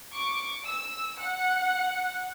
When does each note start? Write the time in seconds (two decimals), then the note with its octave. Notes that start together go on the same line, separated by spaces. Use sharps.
0.13 C#6 D6
0.65 E6
1.18 F#5